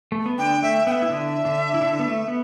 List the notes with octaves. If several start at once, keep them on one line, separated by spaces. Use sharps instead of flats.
A3
B3
D3 D4 G5
A3 E5
B3 E5 G5
E4
D3 D4
D3 D4
E4
D3 D4
B3
A3
B3